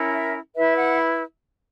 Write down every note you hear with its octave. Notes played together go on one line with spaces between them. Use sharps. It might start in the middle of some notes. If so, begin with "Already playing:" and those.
Already playing: C#4 E4 A#4
E5
E4 B4 E5
F#5